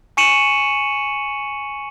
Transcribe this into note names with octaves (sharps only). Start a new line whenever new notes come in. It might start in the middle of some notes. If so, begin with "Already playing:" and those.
G#5 C#6 C#7 D#7 E7 F#7